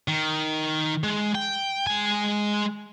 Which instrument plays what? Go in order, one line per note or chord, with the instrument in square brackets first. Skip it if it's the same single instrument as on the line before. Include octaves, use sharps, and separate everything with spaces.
[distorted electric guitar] D#3
G#3
G5
G#3 G#5